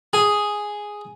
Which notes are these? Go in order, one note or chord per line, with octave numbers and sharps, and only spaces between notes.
G#4